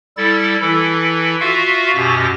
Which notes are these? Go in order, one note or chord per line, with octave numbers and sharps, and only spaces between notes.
G3 E4 A4 A6
E3 E4 A4
F4 F#4 E5 F5
F#2 B2 G4 A#6